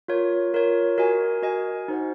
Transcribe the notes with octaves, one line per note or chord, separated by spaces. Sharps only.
F4 A#4 C#5
F4 A#4 C#5
F#4 A#4 D#5 G#5
F#4 A#4 D#5 G#5
D#4 F#4 C5 F#5